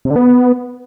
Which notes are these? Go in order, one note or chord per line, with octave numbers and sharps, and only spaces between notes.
C3
D3
B3